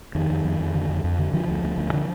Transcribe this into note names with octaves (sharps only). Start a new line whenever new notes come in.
F2 D#3
F2
F2
F2
D3
F2
F2
D3
D3 F3
D2
D2
D2
D3